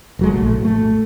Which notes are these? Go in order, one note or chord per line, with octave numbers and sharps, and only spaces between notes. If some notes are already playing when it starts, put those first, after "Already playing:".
F1 F#3 G#3
A#1 A2 A3
A3